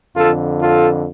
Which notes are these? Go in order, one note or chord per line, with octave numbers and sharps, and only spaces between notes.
F2 D3 F4 A4
F4 A4